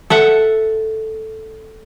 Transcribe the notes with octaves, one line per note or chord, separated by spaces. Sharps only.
A4 E5 F#5